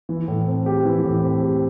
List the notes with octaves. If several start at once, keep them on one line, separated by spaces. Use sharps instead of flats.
E3
A2
C4
G4
E3
A2
C4
G4